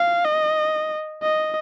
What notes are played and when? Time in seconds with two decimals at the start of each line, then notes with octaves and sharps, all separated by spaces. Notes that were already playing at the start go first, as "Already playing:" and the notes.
Already playing: F5
0.25 D#5
1.23 D#5